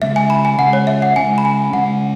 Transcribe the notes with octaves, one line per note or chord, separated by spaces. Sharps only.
C#3 G#3 C#4 E5
G#5
B5
G#5
C#3 G#3 C#4 F#5
C#5
E5
F#5
C#3 G#3 C#4 G#5
B5
G#5
C#3 G#3 C#4 F#5